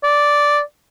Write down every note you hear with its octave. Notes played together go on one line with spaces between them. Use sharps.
D5